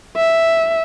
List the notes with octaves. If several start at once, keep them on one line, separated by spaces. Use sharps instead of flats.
E5